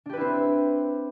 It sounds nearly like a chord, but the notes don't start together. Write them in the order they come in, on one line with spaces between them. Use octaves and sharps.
D4 G4 B4 E4 C4